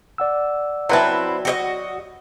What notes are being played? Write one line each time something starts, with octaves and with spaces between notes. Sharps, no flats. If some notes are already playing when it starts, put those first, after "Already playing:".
D5 F#5 E6
F#3 C4 E4 B4 A5
F#4 G4 D#5